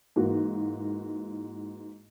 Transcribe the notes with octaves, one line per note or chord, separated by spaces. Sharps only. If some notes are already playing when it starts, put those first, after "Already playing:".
G#2 E3 A#3 F#4